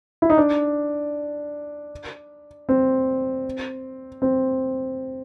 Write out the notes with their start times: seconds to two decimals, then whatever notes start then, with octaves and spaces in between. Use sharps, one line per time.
0.22 E4
0.30 D#4
0.38 D4
2.69 C4
4.22 C4